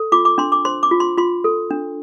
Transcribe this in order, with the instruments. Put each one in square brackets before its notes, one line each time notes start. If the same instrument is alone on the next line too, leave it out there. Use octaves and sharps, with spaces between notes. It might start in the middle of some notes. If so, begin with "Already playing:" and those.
Already playing: [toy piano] A4
F4 D6
D6
D4 C6
D6
C5 C6
D6
F4
C6
F4 C6
A4
D4